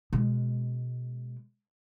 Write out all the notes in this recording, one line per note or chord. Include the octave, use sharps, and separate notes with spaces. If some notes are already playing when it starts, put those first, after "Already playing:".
B2 G#3